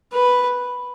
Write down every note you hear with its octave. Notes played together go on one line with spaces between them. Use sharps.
B4